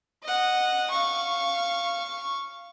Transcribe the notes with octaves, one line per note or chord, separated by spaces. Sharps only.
D#5 F#5
F5 C#6